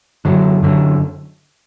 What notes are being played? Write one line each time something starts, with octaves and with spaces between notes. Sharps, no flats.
F#2 D3 F#3
F#2 D3 F#3